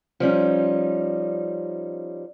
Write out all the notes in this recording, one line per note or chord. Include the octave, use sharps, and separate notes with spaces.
F3 G3 C#4 D#4